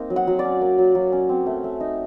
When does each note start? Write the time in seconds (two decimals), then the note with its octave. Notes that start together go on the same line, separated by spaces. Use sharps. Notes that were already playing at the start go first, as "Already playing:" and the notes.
Already playing: A#3 C4 D#4
0.10 F#3
0.16 F#5
0.27 F#3
0.39 D5
0.45 C#4
0.61 A#3
0.78 F#3
0.95 F#3
1.12 C#4
1.29 C4
1.46 A3
1.64 A3
1.80 D#4